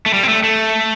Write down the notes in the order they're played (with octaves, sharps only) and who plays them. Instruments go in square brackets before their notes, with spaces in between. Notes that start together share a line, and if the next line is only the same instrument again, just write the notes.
[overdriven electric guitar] A3
G3
C4
A3
A3